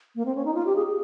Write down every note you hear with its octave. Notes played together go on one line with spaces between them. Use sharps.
A#3
C4
C#4
D#4
F4
G4
G#4
G#4